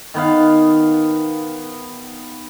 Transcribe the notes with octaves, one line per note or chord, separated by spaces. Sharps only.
D#3 B3 F5